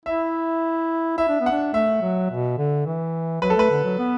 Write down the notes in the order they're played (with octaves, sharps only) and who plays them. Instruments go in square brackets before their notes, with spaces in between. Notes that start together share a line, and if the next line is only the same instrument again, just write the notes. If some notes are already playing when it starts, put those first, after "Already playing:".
[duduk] E4 [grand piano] E5
[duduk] E4 [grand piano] E5
[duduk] D4
B3
[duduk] D4 [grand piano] F#5
[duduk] A3 [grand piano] E5
[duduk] F#3
B2
D3
E3
[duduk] F#3 [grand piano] B4
[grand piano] A4
[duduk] A3 [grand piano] B4
[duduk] D3
F#3
B3